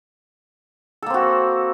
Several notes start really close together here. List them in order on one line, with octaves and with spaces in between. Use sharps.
A4 A#3 C4 F#4